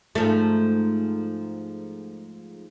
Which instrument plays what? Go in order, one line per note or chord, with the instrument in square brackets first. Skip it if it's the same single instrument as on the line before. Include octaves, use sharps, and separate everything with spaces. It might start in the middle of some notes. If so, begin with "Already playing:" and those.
[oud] G#2 F3 A3